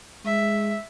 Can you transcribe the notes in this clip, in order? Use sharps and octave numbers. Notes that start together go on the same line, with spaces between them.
G#3 E5